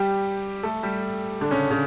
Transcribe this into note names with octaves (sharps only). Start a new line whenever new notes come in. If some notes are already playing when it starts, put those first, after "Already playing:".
Already playing: G3 G4
A3 A4
G3 G4
D3 D4
C#3 C#4
C#3 C#4